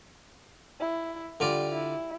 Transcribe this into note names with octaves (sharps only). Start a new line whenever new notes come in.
E4
D3 G3 F4 D5
E4